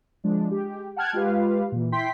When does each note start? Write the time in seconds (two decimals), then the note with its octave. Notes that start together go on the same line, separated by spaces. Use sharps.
0.24 F3 G#3 D4
0.51 G#3 G4
0.96 F#5 G5 A5 F6 F#6 G#6
1.13 G#3 F4 G4 B4 F5
1.72 A#2 E3
1.92 E4 G5 C6 B6